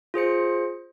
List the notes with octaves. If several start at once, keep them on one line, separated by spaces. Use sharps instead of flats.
F4 G#4 C5 C#7